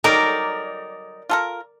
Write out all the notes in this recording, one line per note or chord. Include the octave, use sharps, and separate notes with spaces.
F#3 G3 D#4 A#4 D5
F4 A4 A#4